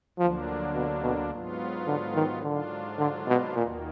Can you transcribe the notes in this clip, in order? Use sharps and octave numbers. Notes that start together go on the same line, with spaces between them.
D2 D3 F3 F#3 A#3 D4
B2
B2
G#2 F#3 B3 F4
D3
D#3
G#2 D3 F#3 D4 F4
D3
B2
D#2 A#2 D#3 A#3